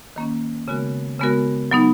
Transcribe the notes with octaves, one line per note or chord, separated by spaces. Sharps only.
D#3 A#3 C#4
C#3 G#3 B3 F#4 A#4
C#3 G#3 B3 F#4 A#4
F#3 B3 D#4